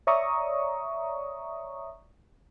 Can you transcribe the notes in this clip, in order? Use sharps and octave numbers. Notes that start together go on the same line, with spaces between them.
C#5 D5 E5 A#5 C#6 D#6